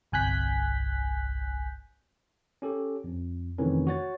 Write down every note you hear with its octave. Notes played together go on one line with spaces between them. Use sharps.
G1 C2 G#5 F#6 G6 B6
C#4 G4 A4
F2
F2 C3 D#3 E3 A3 C#4
F#4 C#5 A6